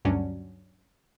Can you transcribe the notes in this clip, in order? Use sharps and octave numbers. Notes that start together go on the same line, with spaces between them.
D2 G2 F#3 C#4 D4